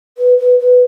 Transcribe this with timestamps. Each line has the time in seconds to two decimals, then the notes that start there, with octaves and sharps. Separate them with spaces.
0.18 B4
0.38 B4
0.59 B4